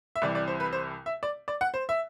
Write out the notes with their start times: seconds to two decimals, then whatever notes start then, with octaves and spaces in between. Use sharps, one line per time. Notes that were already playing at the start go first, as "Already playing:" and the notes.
0.16 E5
0.22 C2 C3 E3 D5
0.35 D5
0.48 C5
0.60 B4
0.73 C5
1.06 E5
1.23 D5
1.48 D5
1.61 F#5
1.74 C5
1.89 E5